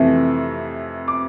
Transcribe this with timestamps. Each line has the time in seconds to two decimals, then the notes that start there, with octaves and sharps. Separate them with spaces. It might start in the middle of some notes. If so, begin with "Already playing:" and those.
Already playing: F2 C3 E3 A3
1.08 D6